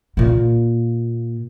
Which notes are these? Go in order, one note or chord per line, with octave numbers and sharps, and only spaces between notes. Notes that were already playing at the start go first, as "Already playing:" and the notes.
A#2 A#3